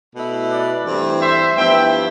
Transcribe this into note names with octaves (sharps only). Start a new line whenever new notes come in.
B2 A3 E4
B4 D5
G2 E3 A3 C4
C5 E5
G2 F3 B3 E4 E5 G5